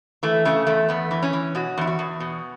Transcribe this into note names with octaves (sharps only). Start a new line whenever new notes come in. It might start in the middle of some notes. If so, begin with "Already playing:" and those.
E3 A3
C#3 A3
E2 A3
E2 B3
E3
C#4
E3
B2 F#4
E2 E4
F#4
E2
B2